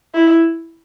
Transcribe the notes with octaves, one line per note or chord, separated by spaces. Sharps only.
E4